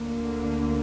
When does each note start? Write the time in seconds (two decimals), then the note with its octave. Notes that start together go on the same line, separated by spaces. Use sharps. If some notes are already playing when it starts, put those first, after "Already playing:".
Already playing: D2 D3 A#3